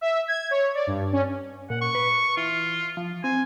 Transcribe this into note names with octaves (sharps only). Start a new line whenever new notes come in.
E5
G#6
C#5
D5
G2
C#4
A#2 F#5
C#6
B4
E3 F4
F3
C4 G#5